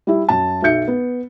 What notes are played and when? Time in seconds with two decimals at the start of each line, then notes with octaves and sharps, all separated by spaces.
0.07 G3 E4
0.29 F#2 A5
0.62 B1 F#4 E5 G6 C#7
0.88 B3